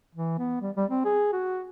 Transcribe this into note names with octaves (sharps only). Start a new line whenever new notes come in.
E3
B3
G3
G3
C4
G#4
F#4